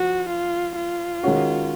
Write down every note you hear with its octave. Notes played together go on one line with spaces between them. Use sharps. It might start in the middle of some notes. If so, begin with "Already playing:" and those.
Already playing: F3 F#4
F4
F4
D#3 G#3 C#4 F#4